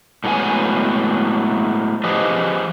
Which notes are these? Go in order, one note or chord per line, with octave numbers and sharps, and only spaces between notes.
A2 F#3 G#3 B3 G#5
F3 G4 G#4 B4 D#5